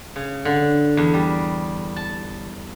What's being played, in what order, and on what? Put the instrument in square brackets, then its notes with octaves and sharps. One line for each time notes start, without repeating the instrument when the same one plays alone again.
[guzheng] C#3
D3
E2
G3
A5